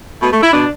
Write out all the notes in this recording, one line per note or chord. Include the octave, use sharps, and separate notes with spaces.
B2 A3
A3
E4
B2 D4